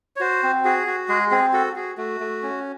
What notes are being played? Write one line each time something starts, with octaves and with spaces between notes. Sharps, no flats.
C#5
F#4 C5
C4
F#4 G#4
F#4
G#3 G#4
C4 G#4
F#4 A4
F#4 G#4
A3 F#4
A3
C#4